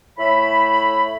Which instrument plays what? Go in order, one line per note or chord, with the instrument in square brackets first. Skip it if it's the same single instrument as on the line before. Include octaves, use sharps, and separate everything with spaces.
[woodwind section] A2 E5 B5